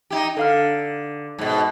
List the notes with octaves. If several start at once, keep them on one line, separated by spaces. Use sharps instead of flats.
D#4 E4 G4
D3 A4 F5 F6
G#2 B2